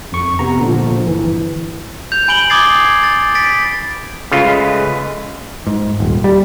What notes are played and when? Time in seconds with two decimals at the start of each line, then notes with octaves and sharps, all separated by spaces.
0.12 F2 C#6
0.39 C3 B3 A#5
0.59 A#2 D3 F3
1.07 G1 E3
2.12 G6 F7
2.28 G#5 B5 D7 F#7 G7
2.50 D6 D#6 G#6 A6 C7
3.04 A6
3.35 A6 B6 D7
4.32 C#3 G#3 A3 F4 B4
5.67 G#2
6.00 D#1
6.24 G3